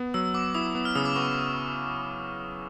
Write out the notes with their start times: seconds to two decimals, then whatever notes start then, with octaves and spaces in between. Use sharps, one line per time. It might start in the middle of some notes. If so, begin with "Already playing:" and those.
Already playing: B3
0.14 F#3 E6
0.34 B3 D6
0.55 E4 D#6
0.75 B3
0.85 F6
0.95 C#3 D#6
1.06 D6
1.16 B3 C#6